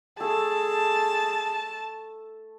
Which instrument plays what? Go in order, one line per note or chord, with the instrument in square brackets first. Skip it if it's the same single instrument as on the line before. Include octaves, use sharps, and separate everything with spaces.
[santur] A3 A4 [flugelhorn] G#4 [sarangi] A5